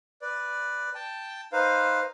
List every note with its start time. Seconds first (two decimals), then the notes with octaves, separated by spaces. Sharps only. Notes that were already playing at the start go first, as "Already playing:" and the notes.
0.22 B4 D5
0.95 G5 A5
1.52 D#4 B4 C5 F5